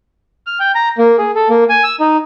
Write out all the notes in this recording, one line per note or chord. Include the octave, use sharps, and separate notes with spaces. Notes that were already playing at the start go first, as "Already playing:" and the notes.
F6
G5
A#5
A#3
G#4
A4
A#3
G#5
E6
D#4